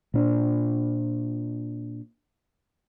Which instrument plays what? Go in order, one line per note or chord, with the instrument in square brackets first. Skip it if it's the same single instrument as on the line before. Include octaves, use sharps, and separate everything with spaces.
[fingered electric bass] A#2 C#4 D4